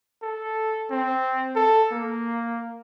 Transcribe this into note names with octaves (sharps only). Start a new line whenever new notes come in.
A4
C4
A4
A#3